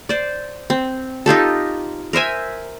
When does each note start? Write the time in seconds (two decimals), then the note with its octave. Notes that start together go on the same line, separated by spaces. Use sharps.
0.09 C5 D5
0.70 C4
1.26 D#4 F4 G4 A4
2.13 A#4 C5 E5 G#5